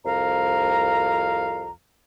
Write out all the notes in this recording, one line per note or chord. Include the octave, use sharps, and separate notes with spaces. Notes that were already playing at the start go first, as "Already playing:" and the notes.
C2 F2 F5 A#5